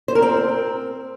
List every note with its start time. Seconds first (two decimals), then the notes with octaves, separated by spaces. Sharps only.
0.08 C5
0.15 A#4
0.22 C4